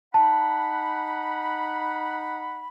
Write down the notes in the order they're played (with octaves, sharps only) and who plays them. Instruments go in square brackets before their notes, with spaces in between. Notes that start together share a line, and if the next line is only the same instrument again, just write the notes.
[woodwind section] D#4 F#5 B5 [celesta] A5